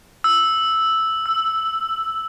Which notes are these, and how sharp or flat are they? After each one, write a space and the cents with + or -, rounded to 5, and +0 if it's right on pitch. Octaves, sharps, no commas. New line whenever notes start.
E6 -5
E6 +10